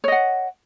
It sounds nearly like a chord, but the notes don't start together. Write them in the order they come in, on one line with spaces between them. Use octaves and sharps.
C#5 D#5 F#5